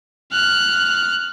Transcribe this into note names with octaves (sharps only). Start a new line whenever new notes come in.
F6 F#6